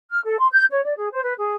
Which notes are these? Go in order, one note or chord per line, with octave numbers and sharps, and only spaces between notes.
F6
A4
C6
G6
C#5
D5
G#4
C5
B4
G#4